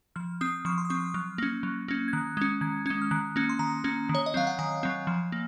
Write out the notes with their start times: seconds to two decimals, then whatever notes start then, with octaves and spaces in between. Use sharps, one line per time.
0.16 F3 F6
0.41 C4 D#6
0.65 F3 C#6
0.78 C6
0.85 D#6
0.90 C4 C#6
1.14 F#3 F6
1.38 A#3 C#4
1.63 F#3
1.88 A#3 C#4
2.08 G#6
2.13 D#3 F#6
2.37 G#3 C#4
2.61 D#3 G#6
2.86 G#3 C#4 G#6
3.02 F6
3.11 D#3 F#6
3.36 A#3 C#4
3.49 C6
3.59 D#3 A#5
3.84 A#3 C#4
4.09 D#3
4.15 C#5
4.26 D#5
4.34 F#3 C4 F5
4.47 F#5
4.59 D#3 G#5
4.83 F#3 C4
5.07 F3
5.32 A#3